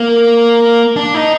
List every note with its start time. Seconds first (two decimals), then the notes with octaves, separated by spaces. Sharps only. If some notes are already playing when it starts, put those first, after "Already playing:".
Already playing: A#3
0.96 D4
1.14 D#4